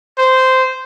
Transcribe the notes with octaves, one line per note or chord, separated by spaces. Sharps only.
C5